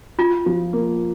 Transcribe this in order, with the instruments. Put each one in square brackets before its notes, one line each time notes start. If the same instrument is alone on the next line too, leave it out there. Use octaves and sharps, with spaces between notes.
[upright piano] E4 [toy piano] F4
[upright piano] F3
A#3